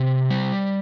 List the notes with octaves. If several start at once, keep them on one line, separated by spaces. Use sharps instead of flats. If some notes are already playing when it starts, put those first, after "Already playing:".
Already playing: C3
G3